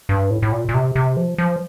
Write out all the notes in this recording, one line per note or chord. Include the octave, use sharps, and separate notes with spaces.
G2
A2
A2
A#2
A#2
C3
C3
F3
F3